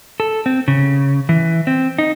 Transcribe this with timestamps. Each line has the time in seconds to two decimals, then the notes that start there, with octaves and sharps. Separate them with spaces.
0.20 A4
0.46 C4
0.68 C#3
1.29 E3
1.67 C4
1.98 D#4